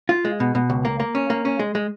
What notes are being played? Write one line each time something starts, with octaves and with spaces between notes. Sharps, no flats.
F4
G#3
B2
B2
C#2
A#3
A#3
C#4
A#3
C#4
G#3
G#3